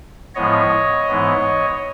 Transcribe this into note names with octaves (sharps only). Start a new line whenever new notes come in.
A2 F3 G#3 B3 C#5 D#5
G#2 E3 G#3 B3